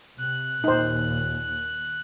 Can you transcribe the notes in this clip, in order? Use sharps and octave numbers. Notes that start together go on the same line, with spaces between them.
C3 F#6
D#2 A#2 D#4 C5